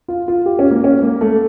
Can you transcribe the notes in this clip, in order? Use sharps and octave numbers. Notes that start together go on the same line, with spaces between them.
F4
F4
G4
C#4
A#3
C#4
A#3
A3